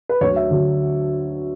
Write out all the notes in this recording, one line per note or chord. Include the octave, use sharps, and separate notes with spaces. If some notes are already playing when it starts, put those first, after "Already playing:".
B4
D2 D3 F#3 C#5
E5
D2 D3 F#3